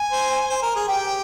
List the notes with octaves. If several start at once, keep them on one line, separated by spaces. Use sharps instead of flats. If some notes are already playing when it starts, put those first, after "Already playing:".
Already playing: G#5
C5
C5
A#4
G#4
G4 G5